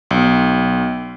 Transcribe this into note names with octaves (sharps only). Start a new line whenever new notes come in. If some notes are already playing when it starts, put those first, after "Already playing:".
B1